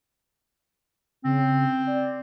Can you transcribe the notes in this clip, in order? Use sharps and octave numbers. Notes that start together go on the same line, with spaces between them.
C#3 C4
D5